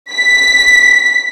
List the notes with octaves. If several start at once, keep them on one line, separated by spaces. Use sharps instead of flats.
B6